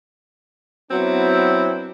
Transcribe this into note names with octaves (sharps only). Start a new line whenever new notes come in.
F#3 B3 C4 D4 E4